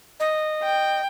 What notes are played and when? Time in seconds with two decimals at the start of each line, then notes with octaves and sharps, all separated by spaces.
0.20 D#5
0.62 G5